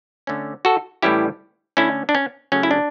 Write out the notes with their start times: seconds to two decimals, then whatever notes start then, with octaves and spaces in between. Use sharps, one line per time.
0.27 D3 A3 C#4
0.65 F#4 A4
1.02 A2 E3 G3 C#4 E4 G4
1.77 D3 A3 C#4 E4
2.09 D4
2.15 C#4
2.52 C#3 F#3 A3 C#4
2.63 E4
2.71 D4